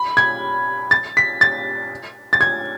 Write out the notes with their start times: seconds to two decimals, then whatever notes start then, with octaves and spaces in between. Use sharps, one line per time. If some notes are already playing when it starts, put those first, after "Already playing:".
Already playing: B5
0.17 G#6
0.91 A6
1.17 B6
1.41 A6
2.33 A6
2.41 G#6